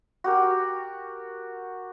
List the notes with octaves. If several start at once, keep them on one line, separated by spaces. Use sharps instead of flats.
F#4 G4 A#4